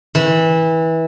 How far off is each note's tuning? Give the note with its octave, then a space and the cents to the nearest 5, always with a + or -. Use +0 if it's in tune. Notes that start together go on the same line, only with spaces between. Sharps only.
E3 -20